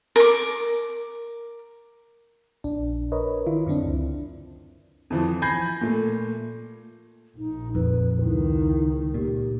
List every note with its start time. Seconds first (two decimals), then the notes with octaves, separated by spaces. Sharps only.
0.16 A#4 D6
2.64 A#1 D4
3.12 A#4 B4 C#5 D#5
3.47 D#3 E4 F4
3.66 F#2 D3 C4 D4
3.86 C#2
5.10 F2 E3 F3
5.42 G#5 B5 G6 G#6 A#6 C7
5.81 A#2 A3
7.38 A#1 D#4
7.75 F2 B4
8.21 C#2 D#3 E4
9.14 A#2 G4